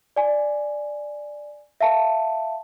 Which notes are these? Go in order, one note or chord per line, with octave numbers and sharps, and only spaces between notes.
D5 G#5
E5 F5 A5